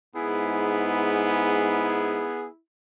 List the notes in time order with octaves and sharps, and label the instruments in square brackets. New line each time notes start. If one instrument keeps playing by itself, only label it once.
[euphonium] G#2 [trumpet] B3 [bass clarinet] E4 [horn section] G#4